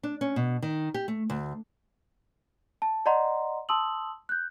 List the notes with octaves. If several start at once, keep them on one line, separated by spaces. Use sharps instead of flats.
D4
C#4
B2
D#3
G4
A3
D2
A5
D5 D#5 F#5 A#5 C6
A5 C6 D#6 E6 F#7
F#6 G6